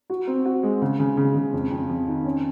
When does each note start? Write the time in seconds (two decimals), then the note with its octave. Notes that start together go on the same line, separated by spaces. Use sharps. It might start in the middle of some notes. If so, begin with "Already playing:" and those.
0.10 F#4
0.27 C4
0.46 F#4
0.63 G#3
0.82 C#3
0.99 C#3
1.17 C#3
1.36 C#3
1.53 F2
1.71 F2
1.89 F2
2.08 D#3
2.25 C#4